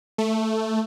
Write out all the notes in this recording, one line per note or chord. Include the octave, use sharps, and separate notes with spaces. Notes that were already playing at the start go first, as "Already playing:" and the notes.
A3